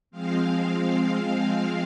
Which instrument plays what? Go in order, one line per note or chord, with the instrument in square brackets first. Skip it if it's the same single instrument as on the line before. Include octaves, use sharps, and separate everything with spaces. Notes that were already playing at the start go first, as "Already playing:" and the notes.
[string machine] F3 G#3 C4 F5